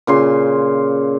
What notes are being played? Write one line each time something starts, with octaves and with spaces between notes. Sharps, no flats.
A#2 C#3 C6